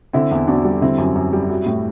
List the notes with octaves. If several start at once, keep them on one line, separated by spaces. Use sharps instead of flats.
D3 C4 E4
E2
E2 D4 F#4
G3
D3 C4 E4
F#2
F#2
G3
F#3
A2